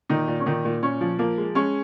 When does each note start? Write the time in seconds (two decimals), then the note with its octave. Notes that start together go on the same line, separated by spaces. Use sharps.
0.09 A#2 D#3 D#4
0.28 A#2
0.40 C#4
0.46 A#2 D#3 D#4
0.65 A#2
0.83 A#2 C#4
1.01 F3
1.19 F3 A#3
1.38 G#3
1.55 G#3 C#4